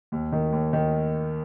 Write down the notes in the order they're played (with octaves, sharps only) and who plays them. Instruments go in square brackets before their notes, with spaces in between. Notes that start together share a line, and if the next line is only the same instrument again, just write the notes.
[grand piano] D#2
D#3
D#2
D#3